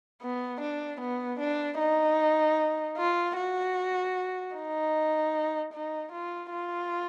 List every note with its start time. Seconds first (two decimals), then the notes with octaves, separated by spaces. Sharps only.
0.22 B3
0.61 D4
1.01 B3
1.40 D4
1.79 D#4
2.98 F4
3.37 F#4
4.56 D#4
5.74 D#4
6.13 F4
6.52 F4